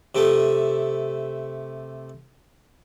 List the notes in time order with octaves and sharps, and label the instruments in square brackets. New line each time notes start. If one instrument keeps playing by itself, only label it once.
[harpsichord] C3 A3